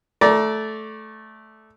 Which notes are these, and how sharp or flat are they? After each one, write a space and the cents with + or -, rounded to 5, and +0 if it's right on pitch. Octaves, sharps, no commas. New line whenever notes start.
A3 -10 D5 -10 A#5 +20